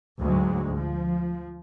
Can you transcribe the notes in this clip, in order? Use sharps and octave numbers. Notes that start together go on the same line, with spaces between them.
D2 G#2 F#3 G#3
F3